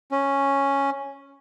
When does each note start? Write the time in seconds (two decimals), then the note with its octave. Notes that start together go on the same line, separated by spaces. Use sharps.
0.12 C#4